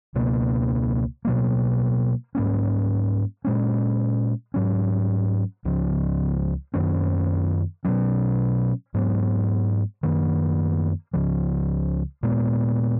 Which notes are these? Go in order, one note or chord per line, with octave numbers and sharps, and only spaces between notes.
C#2 B2 A#3
B2 F#3 A#3
G#2 F#3 A#3 C#4
A#2 G#3 C#4
G#2 F#3 C#4
C#2 C#3 F3
F#2 D#3 A#3 C#4
B2 F#3 C#4
G#2 F#3 B3
F#2 D#3 A#3
C#2 C#3 F3
A#2 G#3 B3